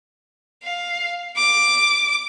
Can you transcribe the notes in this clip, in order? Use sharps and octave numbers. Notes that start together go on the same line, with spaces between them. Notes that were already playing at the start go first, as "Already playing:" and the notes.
F5
D6